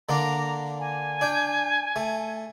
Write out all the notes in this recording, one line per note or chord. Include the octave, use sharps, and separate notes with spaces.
D3 A#3 D4 A#5
G#5
D4 G5
A3